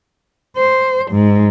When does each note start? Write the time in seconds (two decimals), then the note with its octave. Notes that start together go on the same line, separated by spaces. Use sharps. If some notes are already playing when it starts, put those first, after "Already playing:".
0.56 C5
1.11 G#2